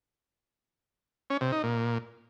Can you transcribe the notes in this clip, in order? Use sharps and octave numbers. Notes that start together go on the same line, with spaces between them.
C#4
C3
D#4
A#2